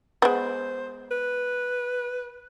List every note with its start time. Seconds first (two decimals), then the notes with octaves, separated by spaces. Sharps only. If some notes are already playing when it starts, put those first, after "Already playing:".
0.22 G#3 B3 C5
1.11 B4